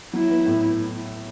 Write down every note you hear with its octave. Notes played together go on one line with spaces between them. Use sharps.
F#3 E4
B3
A2